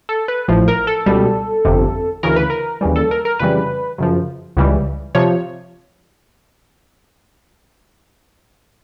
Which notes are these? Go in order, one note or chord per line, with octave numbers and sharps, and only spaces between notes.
A4
B4
A1 A2 F3
A#4
A4
C#2 B2 G3
G1 F2 C3
D2 C#3 E3 A#4
B4
A#4
D#2 C#3 E3 G3
A4
A#4
A#4
F2 C#3 E3 G3 B4
F#2 C#3 F3
C#2 C#3 E3 G3
C3 F3 C#5